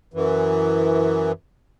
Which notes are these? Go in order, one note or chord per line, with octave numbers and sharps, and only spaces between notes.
F#2 E3